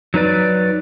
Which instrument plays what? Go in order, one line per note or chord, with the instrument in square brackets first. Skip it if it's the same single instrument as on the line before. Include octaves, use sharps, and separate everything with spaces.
[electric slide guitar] F#3 D#4 B4 D5